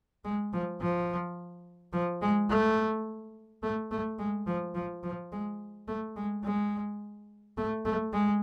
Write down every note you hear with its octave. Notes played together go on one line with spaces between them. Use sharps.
G#3
F3
F3
F3
G#3
A3
A3
A3
G#3
F3
F3
F3
G#3
A3
G#3
G#3
A3
A3
G#3